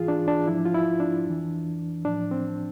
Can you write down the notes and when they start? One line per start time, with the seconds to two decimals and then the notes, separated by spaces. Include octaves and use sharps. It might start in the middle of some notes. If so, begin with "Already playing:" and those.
Already playing: G#2 E3 F4 G#4
0.08 D4
0.28 D4
0.47 G#2 F3 E4
0.65 F4
0.74 E4
1.00 D4
1.26 F2 E3
2.05 A2 F3 D4
2.31 C4